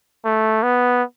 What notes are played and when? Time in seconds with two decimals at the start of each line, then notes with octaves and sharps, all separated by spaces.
0.25 A3
0.63 B3